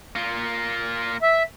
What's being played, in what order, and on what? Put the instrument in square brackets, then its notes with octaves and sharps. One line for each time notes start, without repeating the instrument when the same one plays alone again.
[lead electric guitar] A#3 F4
[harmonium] E5